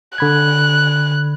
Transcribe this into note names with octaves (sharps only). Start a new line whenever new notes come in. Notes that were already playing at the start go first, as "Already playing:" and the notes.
D3 B5 F#6 G#6